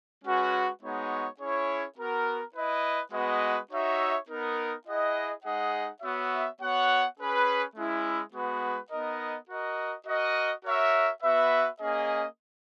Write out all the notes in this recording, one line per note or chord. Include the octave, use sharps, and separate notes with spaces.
G#3 C#4 F#4 B4
G#3 B3 D#4 F#4 C#5
C#4 E4 G#4 C#5
B3 F#4 A#4
E4 B4 D#5
G#3 B3 F#4 B4 D#5
D#4 F#4 C#5 E5
B3 D#4 A#4
E4 G#4 D#5 F#5
G#3 D#4 G#4 D#5 F#5
B3 F#4 C#5 E5
B3 F#4 C#5 F#5
C#4 G#4 B4
G#3 C#4 E4
G#3 B3 F#4 B4
B3 D#4 A#4 D#5
F#4 A#4 D#5
F#4 A#4 D#5
F#4 A#4 C#5 E5
B3 F#4 B4 E5
A#3 C#4 G#4 D#5